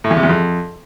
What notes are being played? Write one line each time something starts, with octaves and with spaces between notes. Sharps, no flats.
A2
E2
C3
E2
F2